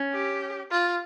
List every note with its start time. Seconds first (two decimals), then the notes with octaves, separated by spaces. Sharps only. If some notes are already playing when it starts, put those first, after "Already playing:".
Already playing: C#4
0.13 G4
0.71 F4